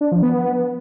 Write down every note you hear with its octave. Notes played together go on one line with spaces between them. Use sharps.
D4
F3
B3